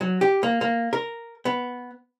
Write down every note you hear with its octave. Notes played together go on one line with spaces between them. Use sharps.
F#3
G4
A#3
A#3
A#4
B3